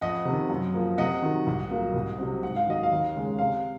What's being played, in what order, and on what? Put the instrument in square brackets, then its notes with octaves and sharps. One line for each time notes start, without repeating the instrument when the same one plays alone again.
[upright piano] F2 D#5 F#5
C3 D#3
F#2
F3 A#3
C3 D#5 F#5
D#3 F#3
C2
A#2 F#3 A#3
C2
C3 F#3 C4
G#2 F#5
F5
D#3 F#3 D#5
F5
D#2
C#3 G#3 C#4
C3 F5